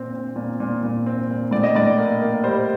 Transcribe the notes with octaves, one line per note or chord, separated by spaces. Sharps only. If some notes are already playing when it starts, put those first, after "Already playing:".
Already playing: A#2 C4
C4
A#2
A#2
A#2
C4
A#2
A2 D5
D#5
A2 D5
A#3
A#3
G3 C5